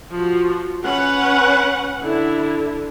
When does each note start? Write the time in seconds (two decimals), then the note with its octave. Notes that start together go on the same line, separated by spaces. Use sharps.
0.11 F3 F#4
0.85 C#4 B4 F#5
2.03 D3 E4